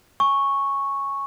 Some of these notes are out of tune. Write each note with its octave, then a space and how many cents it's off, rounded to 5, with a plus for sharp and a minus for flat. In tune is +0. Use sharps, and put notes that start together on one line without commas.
G#5 +0 C#6 -5